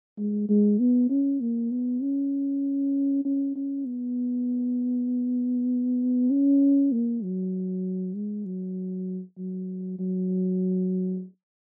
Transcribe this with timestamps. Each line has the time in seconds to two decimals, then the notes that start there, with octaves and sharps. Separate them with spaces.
0.18 G#3
0.49 G#3
0.79 B3
1.10 C#4
1.41 A#3
1.71 B3
2.02 C#4
3.25 C#4
3.56 C#4
3.86 B3
6.31 C#4
6.92 A#3
7.23 F#3
8.15 G#3
8.45 F#3
9.38 F#3
9.99 F#3